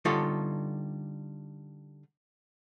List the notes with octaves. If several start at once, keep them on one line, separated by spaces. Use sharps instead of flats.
D3 G3 D#4 F4 A4 C#5